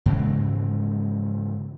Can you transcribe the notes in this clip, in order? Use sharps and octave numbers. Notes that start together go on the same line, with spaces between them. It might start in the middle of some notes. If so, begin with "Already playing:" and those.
G#2 C#3 E3 G#3